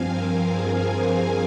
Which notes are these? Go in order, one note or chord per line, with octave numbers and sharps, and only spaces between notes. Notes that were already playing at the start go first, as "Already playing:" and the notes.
Already playing: G2 F3 C4 F5 G#5
A#4
G#4